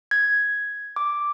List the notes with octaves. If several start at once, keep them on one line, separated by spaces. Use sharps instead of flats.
G#6
D6